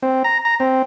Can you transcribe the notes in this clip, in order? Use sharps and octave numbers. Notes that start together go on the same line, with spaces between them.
C4
A#5
A#5
C4